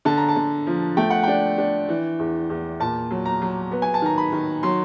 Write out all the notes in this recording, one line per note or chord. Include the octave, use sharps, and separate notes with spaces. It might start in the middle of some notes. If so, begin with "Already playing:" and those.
D3 A5
A#5
A5
D3
F3
A3 G5
F#5
D4 G5
D4
E3
E2
E2
A#2 A5
F#3
A#5
F#3
B3
G#5
A5
D#3 A#5
B5
D#3
F#3 C6